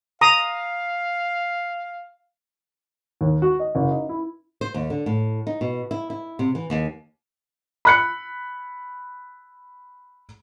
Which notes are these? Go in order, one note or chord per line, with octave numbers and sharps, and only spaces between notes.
F5 A#5 D#6
D#2
F#4
D#5
F#1
D#4
E4
C5
D#2
D3
A2
D#4
B2
E4
E4
C3
E3
D#2
B5 F#6 C#7